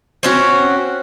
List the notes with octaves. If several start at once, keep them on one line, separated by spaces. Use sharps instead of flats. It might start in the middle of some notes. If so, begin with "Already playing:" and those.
C4 C#4 F#4